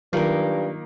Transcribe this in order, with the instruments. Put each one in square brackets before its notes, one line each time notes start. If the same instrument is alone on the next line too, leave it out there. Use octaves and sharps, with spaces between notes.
[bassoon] G2 [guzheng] D#3 A#3 [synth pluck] F#3 F4 A#4